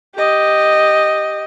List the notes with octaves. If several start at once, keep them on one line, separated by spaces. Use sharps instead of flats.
G4 D#5